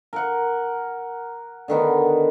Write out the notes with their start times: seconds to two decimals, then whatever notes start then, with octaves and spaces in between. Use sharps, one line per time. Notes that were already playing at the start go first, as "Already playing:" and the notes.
0.13 A#4 F#5
1.68 D3 D#3 B3